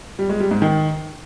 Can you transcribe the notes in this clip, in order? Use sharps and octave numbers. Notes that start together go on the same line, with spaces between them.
G3
G#3
G3
G#2
D#3